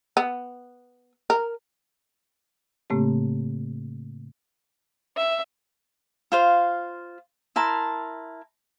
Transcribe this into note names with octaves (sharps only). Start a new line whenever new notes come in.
B3
A#4
A2 C#3 A3 A#3 C4 G4
E5
F4 C5 F5
E4 A#4 A5 C6